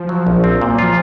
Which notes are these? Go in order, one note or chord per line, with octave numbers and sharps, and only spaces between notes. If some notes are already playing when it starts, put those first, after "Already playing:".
Already playing: F3
F#3
A#1
C4
A#2
F#3
F3 F4